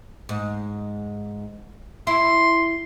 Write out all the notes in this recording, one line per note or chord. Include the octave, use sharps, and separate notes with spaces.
G#2
E4 C6